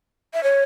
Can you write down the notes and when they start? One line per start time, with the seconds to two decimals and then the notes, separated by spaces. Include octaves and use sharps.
0.34 E5
0.44 C#5